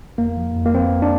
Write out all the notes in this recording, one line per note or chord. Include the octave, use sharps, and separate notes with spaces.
F2 A#3
F3
F2
A#3
F3 C4
F2
D4